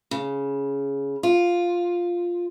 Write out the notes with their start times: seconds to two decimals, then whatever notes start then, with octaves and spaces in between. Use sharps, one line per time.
0.11 C#3
1.23 F4